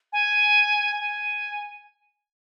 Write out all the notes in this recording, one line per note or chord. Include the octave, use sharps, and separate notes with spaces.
G#5
G#5